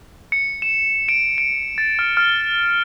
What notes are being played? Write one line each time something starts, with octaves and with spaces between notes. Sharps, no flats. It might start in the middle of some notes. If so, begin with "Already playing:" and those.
C#7
E7
D7
D7
A6
F6
F6